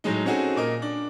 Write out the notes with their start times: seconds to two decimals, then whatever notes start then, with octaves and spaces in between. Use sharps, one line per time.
0.04 A2 F#3 G#3 D#4
0.25 C4 C#4 D#4 F#4 G#4 A4
0.56 A#2 A#4 D#5
0.82 D4